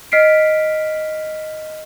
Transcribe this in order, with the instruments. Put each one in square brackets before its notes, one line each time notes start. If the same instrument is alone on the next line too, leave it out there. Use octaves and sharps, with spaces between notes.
[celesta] D#5 F6 B6 C7 D7